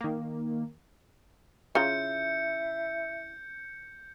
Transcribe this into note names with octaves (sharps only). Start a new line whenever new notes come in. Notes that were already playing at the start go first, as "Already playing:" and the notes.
D#3 A#3
C#3 E4 F4 A#5 G6 C#7